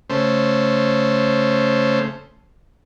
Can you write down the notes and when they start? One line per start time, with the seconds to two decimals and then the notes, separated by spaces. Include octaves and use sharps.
0.10 C#3 A3 C5